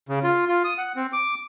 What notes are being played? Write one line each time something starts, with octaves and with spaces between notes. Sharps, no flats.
C#3
F4
F4
D#6
F#5
C4
D6